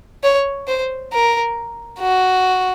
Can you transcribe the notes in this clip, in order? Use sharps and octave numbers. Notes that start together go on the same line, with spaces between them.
C#5
C5
A#4
F#4